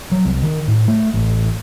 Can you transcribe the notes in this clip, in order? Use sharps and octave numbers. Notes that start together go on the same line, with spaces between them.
F#3
C2
D#3
A2
A3
A1